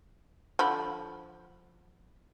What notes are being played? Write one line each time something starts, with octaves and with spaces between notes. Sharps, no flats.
D3 F3 B5